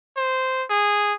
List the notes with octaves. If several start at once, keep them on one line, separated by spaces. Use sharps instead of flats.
C5
G#4